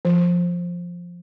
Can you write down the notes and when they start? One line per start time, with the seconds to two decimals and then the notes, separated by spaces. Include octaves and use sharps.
0.05 F3